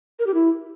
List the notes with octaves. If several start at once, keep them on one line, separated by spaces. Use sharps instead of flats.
A#4
G4
E4